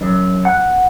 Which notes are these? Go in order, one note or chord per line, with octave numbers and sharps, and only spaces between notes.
F#2
F#5